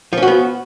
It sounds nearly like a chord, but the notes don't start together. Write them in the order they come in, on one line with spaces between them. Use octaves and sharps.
F3 C#4 F#4 B3